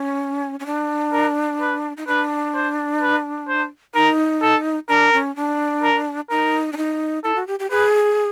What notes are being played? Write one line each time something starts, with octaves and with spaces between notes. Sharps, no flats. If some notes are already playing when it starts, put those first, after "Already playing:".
Already playing: C#4
C#4
D4
A#4
B4
D#4
D4 B4
C5
B4
C5
D#4 A#4
A4
D4 A#4
C#4
D4
A#4
D#4 A#4
D4
D#4
E4 A4
F#4
G4
G4
G#4 B4